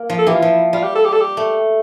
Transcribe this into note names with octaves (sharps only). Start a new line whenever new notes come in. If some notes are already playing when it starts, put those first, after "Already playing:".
Already playing: A#3
F3
A4
E3 G4
F4
F3 E4
G3 F4
G4
A4
G4
A4
G4
A3